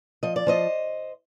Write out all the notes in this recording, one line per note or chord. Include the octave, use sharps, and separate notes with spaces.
F3 D#5
D5
F3 C5 D#5